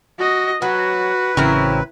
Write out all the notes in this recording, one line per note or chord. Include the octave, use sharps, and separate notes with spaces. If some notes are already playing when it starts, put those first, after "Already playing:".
F#4 D#5
F#3 F#4 B4
A1 C#3 F#3 C4 E4 A#4